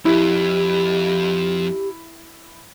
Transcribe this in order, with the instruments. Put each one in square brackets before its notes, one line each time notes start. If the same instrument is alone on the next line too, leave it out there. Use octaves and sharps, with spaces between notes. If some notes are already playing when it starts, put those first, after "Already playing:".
[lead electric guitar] F2 [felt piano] E4 [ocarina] G4